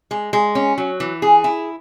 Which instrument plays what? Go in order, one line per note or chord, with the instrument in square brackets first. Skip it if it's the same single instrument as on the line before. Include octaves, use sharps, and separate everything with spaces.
[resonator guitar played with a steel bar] G#3
G#3
C#4
F#3
E3
G#4
E4